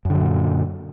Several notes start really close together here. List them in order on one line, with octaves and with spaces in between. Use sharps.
F#2 D3 F#3 A#2